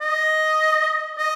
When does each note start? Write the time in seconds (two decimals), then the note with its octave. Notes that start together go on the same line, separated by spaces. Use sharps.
0.01 D#5
1.18 D#5